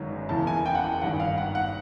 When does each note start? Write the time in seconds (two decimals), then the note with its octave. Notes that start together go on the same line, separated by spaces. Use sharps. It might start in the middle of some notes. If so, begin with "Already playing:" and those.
Already playing: G1 F#2 D#3 G#3 C#4
0.29 F#1 E2 C#3 A5
0.47 G#5
0.66 G5
0.75 F#5
0.84 G5
1.01 G#1 G2 D#3 F#5
1.20 F5
1.38 F#5
1.55 F#5